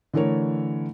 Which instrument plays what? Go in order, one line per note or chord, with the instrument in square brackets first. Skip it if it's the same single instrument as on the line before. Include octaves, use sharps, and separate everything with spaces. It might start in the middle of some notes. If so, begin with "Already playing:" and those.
[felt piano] D3 E3 A3 A#4 C#5